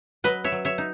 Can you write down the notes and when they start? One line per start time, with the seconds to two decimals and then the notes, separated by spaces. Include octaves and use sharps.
0.24 F#3 B4 D#5
0.44 C#5 E5
0.52 F#3
0.65 C#5 E5
0.78 D#4